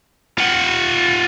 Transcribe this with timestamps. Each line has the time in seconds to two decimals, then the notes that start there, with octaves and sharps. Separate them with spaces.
0.38 F4 F#5